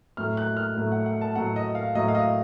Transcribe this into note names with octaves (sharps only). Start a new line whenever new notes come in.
A2 F#3 A3 F6
F#6
F6
A2 F#3 A3
F#5
F#5
A5
A2 F#3 A3 F#5
D#5
F5
A2 F#3 A3 D#5
F5
D#5